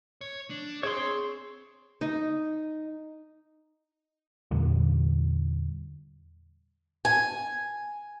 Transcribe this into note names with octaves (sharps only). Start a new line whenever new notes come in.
C#5
D4
C4 G#4 C#5 C6
D#4
E2 A#2 D3 G3
G#5